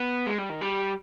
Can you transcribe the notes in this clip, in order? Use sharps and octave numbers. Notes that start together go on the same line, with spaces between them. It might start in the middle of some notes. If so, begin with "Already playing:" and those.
Already playing: B3
G#3
G3
D#3
G3